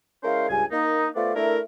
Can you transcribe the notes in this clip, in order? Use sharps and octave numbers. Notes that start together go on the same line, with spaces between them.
G#3 C#4 E4 A#4 C5 F5
C#2 G2 G#5
A#3 D#4
A3 B3 F4 C5 D5
A3 D4 E4 A#4